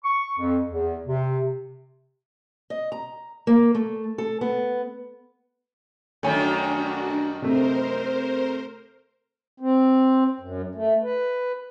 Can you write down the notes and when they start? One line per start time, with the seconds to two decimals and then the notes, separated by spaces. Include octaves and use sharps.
0.04 C#6
0.38 F2
0.69 E2
1.07 C3
2.70 D#5
2.92 A#5
3.47 A#3
3.75 A3
4.18 A4
4.41 B3
6.23 F#2 D#3 G3 A3 D4 F#4 C#5 G#5
7.42 C3 A3 A#4 C5
9.60 C4
10.40 F#2
10.75 A3
11.03 B4